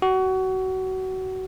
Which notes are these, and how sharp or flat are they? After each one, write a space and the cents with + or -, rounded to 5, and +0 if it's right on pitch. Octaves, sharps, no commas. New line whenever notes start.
F#4 +25